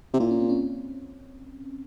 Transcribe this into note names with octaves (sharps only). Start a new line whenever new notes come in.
C3
A#2 E4
C#4
C4
C#4